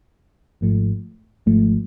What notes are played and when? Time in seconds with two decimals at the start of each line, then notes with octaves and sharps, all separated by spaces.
0.61 G#1 G#2 F3 A3
1.46 G#1 G#2 F3 A3